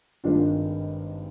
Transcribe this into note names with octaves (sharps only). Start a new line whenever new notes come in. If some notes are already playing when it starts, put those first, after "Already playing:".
G#1 G2 D#3 G#3 D4 F4